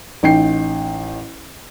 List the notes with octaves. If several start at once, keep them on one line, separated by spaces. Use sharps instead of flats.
A1 D#4 G5 C7